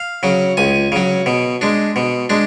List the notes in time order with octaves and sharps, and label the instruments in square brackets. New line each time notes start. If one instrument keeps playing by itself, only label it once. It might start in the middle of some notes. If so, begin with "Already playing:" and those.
Already playing: [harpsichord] F5
C#3 F#3
C#2 G#5
C#3 F#3
B2
G#3 D4
B2
G#3 D4